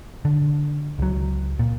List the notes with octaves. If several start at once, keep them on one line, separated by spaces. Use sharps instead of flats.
D3
C#2 F#3
A#2